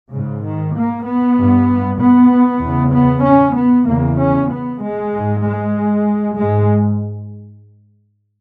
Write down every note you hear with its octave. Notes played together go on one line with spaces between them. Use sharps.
G#2 C#3
D#3
A#3
B3
G2
B3
E2 C#3
B3
C#4
B3
E2 C#3 A#3
C#4
B3
G#3
G#2
G#3
G#2 G#3